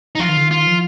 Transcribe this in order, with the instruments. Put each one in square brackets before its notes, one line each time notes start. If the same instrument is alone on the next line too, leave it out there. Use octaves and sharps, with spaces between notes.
[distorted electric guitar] D#4
[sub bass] F3 [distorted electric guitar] F4
[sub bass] D#3
D3
D#3
[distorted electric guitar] F4
[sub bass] F3